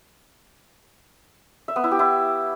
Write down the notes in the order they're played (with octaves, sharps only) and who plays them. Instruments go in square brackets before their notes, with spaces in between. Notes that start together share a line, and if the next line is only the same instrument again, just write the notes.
[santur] E5
B3
E4
G4
E4